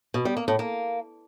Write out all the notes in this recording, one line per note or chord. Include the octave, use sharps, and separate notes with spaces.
B2
G3
A#3
A2
A#3